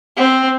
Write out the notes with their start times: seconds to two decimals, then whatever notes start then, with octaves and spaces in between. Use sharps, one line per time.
0.17 C4